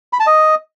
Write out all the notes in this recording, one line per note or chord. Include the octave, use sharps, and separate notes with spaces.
B5
A5
D#5